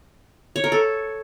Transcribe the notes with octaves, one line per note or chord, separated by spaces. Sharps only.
C#5
A#4
A4